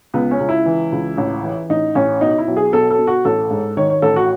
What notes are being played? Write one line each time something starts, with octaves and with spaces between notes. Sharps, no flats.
C#2 B3
C#4
C#2
E4
E3
C#2
A1
E3
A1 D#4
A1 C#4
B2 D#4
E4
B1
G#4
B2 A4
A4
B2
F#4
A1 A4
G#2
D#3 C#5
C#5
A1 A4
F#4